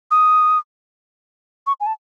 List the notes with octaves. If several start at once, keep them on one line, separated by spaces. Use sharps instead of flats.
D#6
C#6
G#5
A5